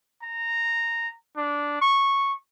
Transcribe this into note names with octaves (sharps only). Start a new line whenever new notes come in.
A#5
D4
C#6